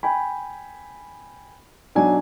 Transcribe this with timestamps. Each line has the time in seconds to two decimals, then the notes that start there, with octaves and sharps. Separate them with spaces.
0.03 G5 G#5 B5
1.95 B1 F#3 D4 G#5